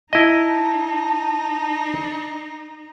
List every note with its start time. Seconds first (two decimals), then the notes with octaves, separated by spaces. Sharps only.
0.13 D#4 E4 D#5 A5